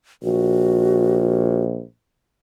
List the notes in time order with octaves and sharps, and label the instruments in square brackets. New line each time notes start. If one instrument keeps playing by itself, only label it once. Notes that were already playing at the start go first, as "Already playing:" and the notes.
[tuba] A#1 [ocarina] F#4